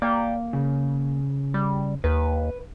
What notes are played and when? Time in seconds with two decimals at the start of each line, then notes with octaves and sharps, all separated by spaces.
0.02 A#3 D5 G5
0.53 C#3
1.54 G3
2.04 D#2 B4